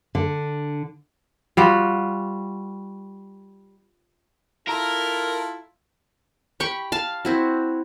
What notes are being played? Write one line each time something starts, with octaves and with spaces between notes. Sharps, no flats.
D3
G3 F4 F#4
E4 F4 A4 A#4 A#5
G4 G5 B5 C#6
F5 A5
C4 E4 F#4